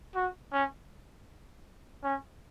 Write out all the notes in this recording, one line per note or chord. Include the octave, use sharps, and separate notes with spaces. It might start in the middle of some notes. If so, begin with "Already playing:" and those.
F#4
C#4
C#4